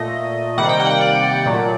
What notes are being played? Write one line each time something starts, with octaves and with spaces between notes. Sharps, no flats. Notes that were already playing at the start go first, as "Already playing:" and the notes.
Already playing: A#2 A3 D#5
C3 D#3 G3 A#3 F#5
G5
F#5
F#5
D5
A#2 F#3 A3